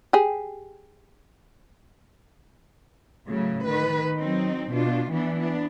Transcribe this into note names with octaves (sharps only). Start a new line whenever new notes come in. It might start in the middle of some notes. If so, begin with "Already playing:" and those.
G4 G#4
A2 C#3 F#3
D#3 B4
F#3 C4 D#4
B2 D4 F4
E3 B3 D4
B3 D4